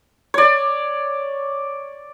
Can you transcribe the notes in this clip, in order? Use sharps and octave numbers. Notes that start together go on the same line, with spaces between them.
C#5 D5